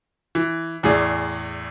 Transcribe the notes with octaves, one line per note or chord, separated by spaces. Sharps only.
E3
E2 A2 G#4 D5